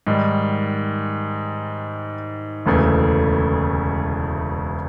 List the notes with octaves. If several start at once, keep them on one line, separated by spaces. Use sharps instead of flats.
G#2 D#3 G3
E1 D2 C#3 E3 A3